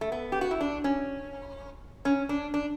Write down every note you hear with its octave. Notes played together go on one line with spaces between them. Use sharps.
A3
B3
G4
F#4
E4
D4
C#4
C#4
D4
D4